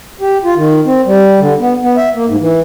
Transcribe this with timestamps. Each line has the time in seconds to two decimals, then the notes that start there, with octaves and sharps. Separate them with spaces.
0.21 G4
0.44 F4
0.56 D#3
0.86 C4
1.06 G3
1.39 D3
1.60 B3
1.82 B3
1.97 E5
2.15 A#3
2.28 G#2
2.40 E3